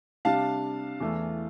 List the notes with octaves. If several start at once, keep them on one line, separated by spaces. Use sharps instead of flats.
C3 G3 D4 F5 A5
E2 E3 A3